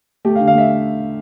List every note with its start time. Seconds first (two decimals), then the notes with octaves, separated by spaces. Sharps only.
0.25 A3 G4
0.35 F5
0.39 D3
0.48 F5
0.55 A3 E5